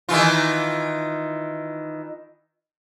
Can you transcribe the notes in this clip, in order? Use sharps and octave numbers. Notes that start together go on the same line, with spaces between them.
D#3 E3 F4